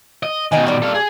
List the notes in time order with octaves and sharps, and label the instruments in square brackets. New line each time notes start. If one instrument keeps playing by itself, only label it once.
[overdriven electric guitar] D#5
[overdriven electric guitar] B2 D#3 [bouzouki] D#4 D#5 G#5
[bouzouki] A#2 G3
[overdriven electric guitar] A4 F5
G#4